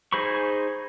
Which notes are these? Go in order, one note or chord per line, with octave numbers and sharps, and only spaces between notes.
D#4 G#4 C5 B5 C#6